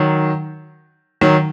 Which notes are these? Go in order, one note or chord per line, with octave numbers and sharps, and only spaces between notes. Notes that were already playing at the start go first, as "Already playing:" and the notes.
Already playing: D#3 F#3
D#3 F#3